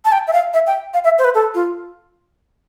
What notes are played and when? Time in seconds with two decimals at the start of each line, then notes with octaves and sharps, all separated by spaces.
0.05 A5
0.12 G5
0.27 E5
0.33 F5
0.54 E5
0.67 G5
0.94 F5
1.04 E5
1.19 C5
1.24 B4
1.35 A4
1.54 F4